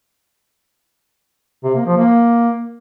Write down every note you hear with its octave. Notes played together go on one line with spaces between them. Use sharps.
C3
A#3
F3
A#3